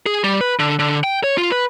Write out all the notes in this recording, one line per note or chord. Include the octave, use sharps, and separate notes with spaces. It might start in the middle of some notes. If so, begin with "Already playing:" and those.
G#4
G3
B4
D3
D3
G5
C#5
F4
B4